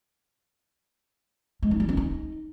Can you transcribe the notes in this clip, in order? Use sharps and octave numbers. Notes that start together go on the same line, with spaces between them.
G#3
D#4
G3
C4
D#4